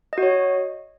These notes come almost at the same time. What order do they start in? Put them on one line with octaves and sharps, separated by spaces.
D#5 F#4 C#5